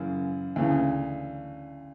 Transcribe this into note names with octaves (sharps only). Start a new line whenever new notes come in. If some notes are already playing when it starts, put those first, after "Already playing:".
Already playing: F#2 C#3 E3
D2 C#3 E3